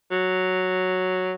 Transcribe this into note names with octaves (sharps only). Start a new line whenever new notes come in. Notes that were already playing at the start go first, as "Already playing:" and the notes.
F#3